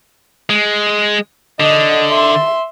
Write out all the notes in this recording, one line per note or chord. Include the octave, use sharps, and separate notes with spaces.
G#3
D3 D#5
E5 C6